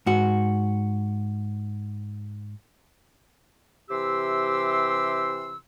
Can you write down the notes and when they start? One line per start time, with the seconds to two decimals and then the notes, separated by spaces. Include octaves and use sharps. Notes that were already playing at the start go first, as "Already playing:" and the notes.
0.06 G#2 F#4
3.90 C3 E3 G4 C6 E6